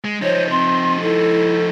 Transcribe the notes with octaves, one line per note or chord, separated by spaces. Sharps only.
G#3
F3 D#4 C5 C#5
C4 C6
E4 A4